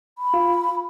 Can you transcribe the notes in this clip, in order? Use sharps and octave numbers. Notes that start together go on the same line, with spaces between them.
B5
F4